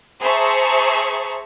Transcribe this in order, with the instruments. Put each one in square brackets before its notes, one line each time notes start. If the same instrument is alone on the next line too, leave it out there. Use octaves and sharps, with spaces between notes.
[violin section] G#4 C5 E5 A5 A#5 C#6